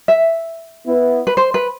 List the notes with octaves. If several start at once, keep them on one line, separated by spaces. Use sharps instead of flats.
E5
B3 E4 B4
B4
C5
B4